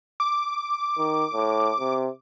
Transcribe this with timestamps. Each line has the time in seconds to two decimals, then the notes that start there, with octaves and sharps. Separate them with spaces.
0.20 D6
0.97 D#3
1.33 A2
1.80 C3